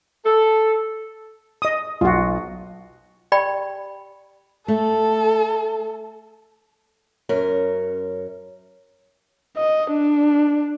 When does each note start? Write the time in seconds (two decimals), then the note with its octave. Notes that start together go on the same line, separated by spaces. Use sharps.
0.24 A4
1.62 D#5 D#6
2.01 B1 F4 F#4
3.32 G4 D5 G5 B5
4.68 A3 A4
7.29 F#2 C#4 A#4
9.58 D#5
9.92 D4